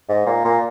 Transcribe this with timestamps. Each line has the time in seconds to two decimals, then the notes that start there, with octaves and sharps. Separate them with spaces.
0.09 G#2
0.26 A#2
0.45 A#2